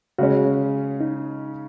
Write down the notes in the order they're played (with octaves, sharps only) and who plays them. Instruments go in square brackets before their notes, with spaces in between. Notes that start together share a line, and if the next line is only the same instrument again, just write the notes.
[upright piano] C#3 G#3 C#4 [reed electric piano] F#4
[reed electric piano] D#4